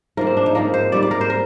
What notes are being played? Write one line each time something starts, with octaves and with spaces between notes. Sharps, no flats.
G#2 F3 A#3 A#4
C4
D4
D#4
G#2 F3 A#3 A#4
C5
G#2 G3 C4 D5
D5
A#4
C5
A#4